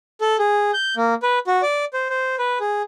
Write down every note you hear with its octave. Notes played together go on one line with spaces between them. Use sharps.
A4
G#4
G6
A#3
B4
F#4
D5
C5
C5
B4
G#4